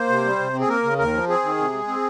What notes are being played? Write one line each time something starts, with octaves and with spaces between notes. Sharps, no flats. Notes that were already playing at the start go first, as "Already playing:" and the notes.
Already playing: A#3 C5
C3
G3
C3
C4
G#4
A#3 A#4
C#3
D#2 A#4
F3
C4 G#4
D#3
C3
G#3
C4